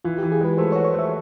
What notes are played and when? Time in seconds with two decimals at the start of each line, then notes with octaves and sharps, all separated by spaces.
0.05 E3 F4
0.18 E3 G4
0.32 G#4
0.41 G#3 B4
0.58 A3 C5
0.72 C#5
0.76 F#4
0.84 C#5
0.94 A3 E5